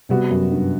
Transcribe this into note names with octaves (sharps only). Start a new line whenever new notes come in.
C3 G3 B3 F#4
F#2
G2